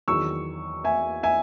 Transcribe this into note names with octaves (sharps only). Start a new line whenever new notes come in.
E2 D#3 F#3 C#6 E6
E5 G#5
E5 G#5